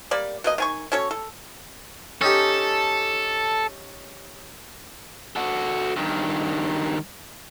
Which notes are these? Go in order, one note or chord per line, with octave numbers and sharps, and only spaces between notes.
G3 A#3 D5
B2 A#3 D#5
D#3 G#5 C#6
C#4 F#4 A4 C#5
A4
C#4 D#4 G4 A4
F#4 A4
G2 D#3